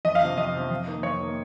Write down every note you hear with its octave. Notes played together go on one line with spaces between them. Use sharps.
F2 D#5
F5
C3 F3
F2 D#5
C3 F3
F2
D#3 A#3
F2 C#5
D#3 A#3